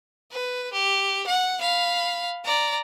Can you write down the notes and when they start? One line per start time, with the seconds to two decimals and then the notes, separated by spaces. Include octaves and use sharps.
0.31 B4
0.73 G4
1.27 F#5
1.60 F5 B5
2.44 D5 A#5